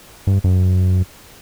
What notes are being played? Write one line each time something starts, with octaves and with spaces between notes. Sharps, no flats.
G2
F#2